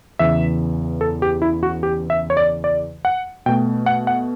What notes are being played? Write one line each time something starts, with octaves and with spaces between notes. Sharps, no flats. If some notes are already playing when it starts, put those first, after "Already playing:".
E2 C#3 E3 E5
A4
G4
E4
F#4
G4
E5
C#5
D5
D5
F#5
B2 A3 G5
F#5
F#5